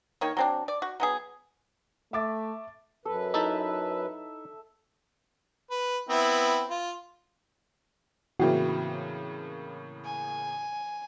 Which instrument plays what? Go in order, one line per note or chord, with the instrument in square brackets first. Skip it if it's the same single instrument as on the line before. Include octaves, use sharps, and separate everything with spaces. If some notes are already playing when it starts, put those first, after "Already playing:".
[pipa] D#3 A#3 C#5
F#3 C4 D4
D5
F#4
F#3 B3 G#4
[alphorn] A3 [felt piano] E5 D6 A6
[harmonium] F#2 B4 [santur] A4
[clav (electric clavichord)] D#4 E4 A4 [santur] E5
[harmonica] B4
B3 C4 E4
F4
[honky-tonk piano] A2 C#3 A#3 [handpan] E3 C4 E4 [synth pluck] F#4 G5
[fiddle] G#5